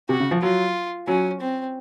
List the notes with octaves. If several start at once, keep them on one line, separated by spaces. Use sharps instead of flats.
C3 F#4
C#3
F3
F#3 F4
F#3 C#4
C4